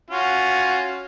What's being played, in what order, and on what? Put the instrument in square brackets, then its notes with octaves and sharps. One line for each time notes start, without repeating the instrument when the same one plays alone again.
[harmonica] C#4 F4 F#4